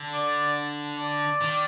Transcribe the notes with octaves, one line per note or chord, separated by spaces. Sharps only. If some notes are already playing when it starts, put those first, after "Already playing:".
Already playing: D3
D5
D5
D#3